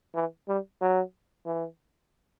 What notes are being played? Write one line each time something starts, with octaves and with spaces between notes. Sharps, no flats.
E3
G3
F#3
E3